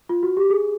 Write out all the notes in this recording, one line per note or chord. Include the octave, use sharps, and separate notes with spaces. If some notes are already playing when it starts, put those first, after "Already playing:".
F4
F#4
G4
G#4